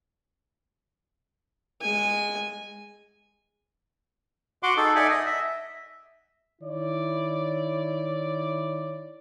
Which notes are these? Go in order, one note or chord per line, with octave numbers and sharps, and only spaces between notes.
G#3 G#5
F#4 F#5 C6 D6
D#4 G#4 A4
D#4 D5 E5 F#5 G#5
D#5
E5
D#3 E4 C#5 D5